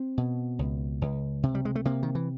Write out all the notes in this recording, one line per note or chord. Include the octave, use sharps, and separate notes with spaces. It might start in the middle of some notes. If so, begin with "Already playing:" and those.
Already playing: C4
B2
C#2
C#2
C3
G3
G#3
A3
C3 A#3
D#3
E3